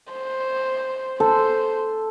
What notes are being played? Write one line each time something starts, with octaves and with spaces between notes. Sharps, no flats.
C5
A4 C5